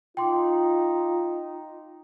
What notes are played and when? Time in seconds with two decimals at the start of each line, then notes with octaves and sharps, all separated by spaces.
0.17 D#4 F4 G5 C6 D6